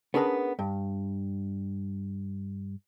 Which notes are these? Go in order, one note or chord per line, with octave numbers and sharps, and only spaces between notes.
B3 C#4 D4 G#4 A#4 B4
G2